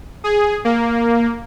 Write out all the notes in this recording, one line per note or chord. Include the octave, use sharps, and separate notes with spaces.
G#4
A#3